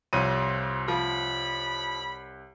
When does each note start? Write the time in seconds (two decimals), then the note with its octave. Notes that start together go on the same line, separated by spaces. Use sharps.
0.13 C2 F2 C#5 D#7
0.88 F3 B5